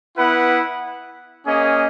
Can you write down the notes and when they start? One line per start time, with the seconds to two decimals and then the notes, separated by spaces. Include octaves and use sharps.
0.17 B3 E4 B4 F#5
1.45 A#3 C#4 G#4 D#5